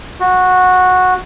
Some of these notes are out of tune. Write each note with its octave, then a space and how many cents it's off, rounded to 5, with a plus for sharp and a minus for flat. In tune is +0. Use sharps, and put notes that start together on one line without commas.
F#4 -10